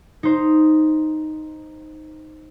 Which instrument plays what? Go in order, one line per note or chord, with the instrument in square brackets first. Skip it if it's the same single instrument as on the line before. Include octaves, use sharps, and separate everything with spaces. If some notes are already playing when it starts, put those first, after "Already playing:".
[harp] D#4 C5